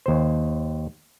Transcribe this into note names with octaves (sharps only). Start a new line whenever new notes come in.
D#2 C5